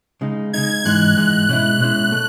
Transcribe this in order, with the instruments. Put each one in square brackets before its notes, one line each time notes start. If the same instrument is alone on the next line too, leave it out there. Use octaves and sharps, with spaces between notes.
[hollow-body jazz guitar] C#3 G#3 D#4
[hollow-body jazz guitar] C#3 G#3 D#4 [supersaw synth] G#6
[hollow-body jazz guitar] G#2 E3 G#3 D#4 [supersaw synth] F#6
[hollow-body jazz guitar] G#2 E3 G#3 D#4 [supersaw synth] F#6
[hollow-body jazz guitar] B2 G#3 C#4 E4 [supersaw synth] F#6
[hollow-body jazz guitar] B2 G#3 C#4 E4
A3